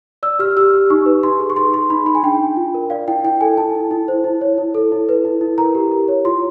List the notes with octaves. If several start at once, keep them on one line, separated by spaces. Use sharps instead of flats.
D5 E6
G4 F6
G4 E6
G4
D#4 C#6
B4
D#4 C6
G#4
C#6
G#4 C6
G#4 C6
D#4 B5
G#4 B5
G#5
D4 G5
D4
F4
A#4
D5 F5
E4 G5
E4 G5
A4 G#5
E4 A5
E4
E4
C5
E4
C#5
E4
A4
E4
B4
E4
E4
A#4 A#5
G4
A#4
C#5
F4 C6